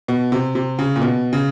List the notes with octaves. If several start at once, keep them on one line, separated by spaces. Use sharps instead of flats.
B2
C3
C3
C#3
A#2
B2
C#3